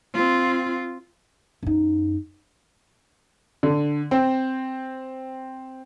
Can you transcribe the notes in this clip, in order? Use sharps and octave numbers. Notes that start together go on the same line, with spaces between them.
C4 F4
F#2 D#4
D3
C4 C5